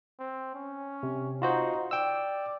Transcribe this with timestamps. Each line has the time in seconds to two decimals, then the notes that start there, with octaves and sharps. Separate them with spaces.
0.19 C4
0.55 C#4
1.03 C3
1.42 D#4 F4 F#4 C5
1.91 D5 G5 E6